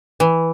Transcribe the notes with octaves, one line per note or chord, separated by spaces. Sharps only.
E3